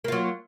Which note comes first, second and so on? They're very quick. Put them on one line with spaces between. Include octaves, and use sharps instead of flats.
A#3 F4 F#3